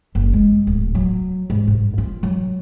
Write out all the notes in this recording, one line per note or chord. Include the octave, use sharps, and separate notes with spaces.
F#1
G#3
D1
F#3
G#2
G2
F4
F#3